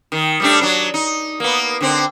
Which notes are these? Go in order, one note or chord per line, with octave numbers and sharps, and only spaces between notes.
D#3
G3 A3 D4
F#3 D4
D#4
A#3 B3
D3 C4